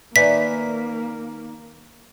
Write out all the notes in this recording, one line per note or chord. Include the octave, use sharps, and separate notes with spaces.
D#3 A#3 B4 D5 E5 G#5 B6